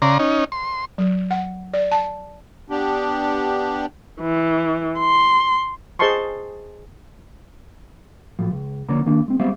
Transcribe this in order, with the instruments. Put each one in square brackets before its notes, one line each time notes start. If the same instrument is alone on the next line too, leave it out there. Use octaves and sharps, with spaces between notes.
[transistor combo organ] C#3 D5 A#5 C6
C#4 D#4
C6
[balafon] F#3
F#5
D5
A5
[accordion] B3 D4 G4
[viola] E3
C6
[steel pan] G#4 C5 D#5 A5 C6 C#6
[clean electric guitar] A2 F3 F#3
C#2
D3 F3 A#3 C#4 D4 A#5
D#3 A#3 D4
G#3 C4
G3 G#3 B3 C4 E5 F5